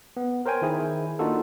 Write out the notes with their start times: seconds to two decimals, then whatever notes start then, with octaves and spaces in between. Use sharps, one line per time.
0.17 B3
0.46 A#4 C5 C#5 G5 G#5
0.62 D#3 E4 G#4
1.19 A#3 D4 D#4 F4 F#4 A4